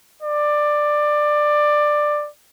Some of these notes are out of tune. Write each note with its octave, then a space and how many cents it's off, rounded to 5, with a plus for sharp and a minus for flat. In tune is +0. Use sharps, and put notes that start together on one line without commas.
D5 +15